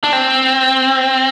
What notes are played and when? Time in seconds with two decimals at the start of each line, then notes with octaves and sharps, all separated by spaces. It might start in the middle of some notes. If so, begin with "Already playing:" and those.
0.04 D4
0.13 C4